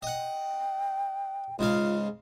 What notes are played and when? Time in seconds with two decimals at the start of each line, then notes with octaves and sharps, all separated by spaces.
0.03 D#5 F#5 G5
1.59 G#2 C#3 F4 F5